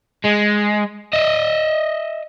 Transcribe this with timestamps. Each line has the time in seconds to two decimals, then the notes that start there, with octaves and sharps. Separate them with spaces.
0.24 G#3
1.13 D#5 E5